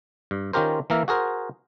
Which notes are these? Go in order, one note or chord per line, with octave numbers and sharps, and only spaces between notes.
G2
D#3 C#4 F4 G4 A#4 C5
E3 A#3 A#4 E5
F#4 G#4 A#4 C5